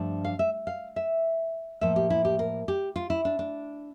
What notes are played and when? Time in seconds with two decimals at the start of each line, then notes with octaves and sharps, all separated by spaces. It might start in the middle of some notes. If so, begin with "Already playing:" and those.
Already playing: G2 F3 A3 D4
0.25 F5
0.39 E5
0.67 F5
0.96 E5
1.81 A2 F3 A#3 E5
1.96 G4
2.10 E4
2.25 G4
2.39 A#4
2.68 G4
2.96 F4
3.10 E4
3.25 D4
3.39 D4